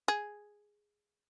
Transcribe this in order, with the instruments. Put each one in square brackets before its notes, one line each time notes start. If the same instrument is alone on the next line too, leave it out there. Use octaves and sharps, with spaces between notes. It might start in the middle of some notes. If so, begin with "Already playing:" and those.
[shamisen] G#4